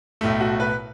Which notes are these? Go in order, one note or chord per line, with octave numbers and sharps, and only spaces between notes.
B1 A2 A3
F#4
B4